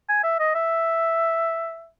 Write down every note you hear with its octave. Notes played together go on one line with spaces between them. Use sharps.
G#5
E5
D#5
E5